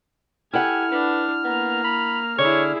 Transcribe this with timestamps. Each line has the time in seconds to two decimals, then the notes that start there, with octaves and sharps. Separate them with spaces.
0.53 E4 G4 A4 F#5 G#5 F6
0.92 D4 B4
1.44 A#3 B3 A#5
1.84 B5
2.38 D3 E4 G#4 C#5